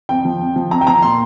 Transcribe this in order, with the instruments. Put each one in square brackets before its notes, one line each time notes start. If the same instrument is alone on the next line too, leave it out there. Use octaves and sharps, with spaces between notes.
[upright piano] F2 G5
F3
F2
F3
F2 A#5
G5
F3 A#5
A#2 C6